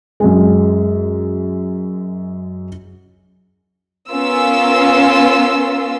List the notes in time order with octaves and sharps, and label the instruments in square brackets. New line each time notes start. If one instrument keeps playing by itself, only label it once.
[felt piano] F#2 G#3
[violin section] B3 C#4 F4 A#4 E6